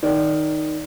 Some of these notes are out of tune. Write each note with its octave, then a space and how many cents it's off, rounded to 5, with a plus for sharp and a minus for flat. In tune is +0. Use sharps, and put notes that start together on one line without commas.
D#3 +0 D5 -20